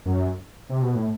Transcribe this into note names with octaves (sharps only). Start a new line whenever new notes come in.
F#2
C3
B2
A2